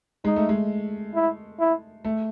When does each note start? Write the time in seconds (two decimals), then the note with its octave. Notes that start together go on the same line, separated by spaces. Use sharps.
0.25 G#3 D#4
0.36 A3
0.49 G#3
1.14 E4
1.60 E4
2.05 A3